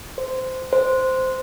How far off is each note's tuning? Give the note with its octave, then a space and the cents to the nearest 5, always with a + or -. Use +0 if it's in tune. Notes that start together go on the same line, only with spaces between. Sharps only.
C5 -15
C5 -10